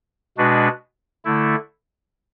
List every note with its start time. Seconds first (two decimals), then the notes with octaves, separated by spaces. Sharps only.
0.38 B2 G#3 D4 F#4 B4
1.25 D3 A3 E4